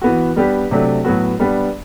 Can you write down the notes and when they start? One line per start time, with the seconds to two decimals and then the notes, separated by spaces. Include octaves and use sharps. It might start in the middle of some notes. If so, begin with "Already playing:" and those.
0.02 E3 B3 F#4
0.36 G3 B3 D4 G4
0.71 C3 F#3 A3 D4
1.05 A2 F#3 B3 F#4
1.40 G3 B3 D4